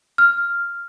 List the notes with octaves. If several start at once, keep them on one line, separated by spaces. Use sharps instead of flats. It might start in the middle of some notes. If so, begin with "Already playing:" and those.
F6